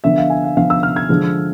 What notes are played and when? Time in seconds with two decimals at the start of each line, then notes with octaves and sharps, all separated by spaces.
0.04 D3 F3 B3 E5
0.18 F5
0.30 G#5
0.44 F5
0.57 D3 F3 B3 F5
0.70 E6
0.83 F6
0.96 G#6
1.09 D3 F3 G#3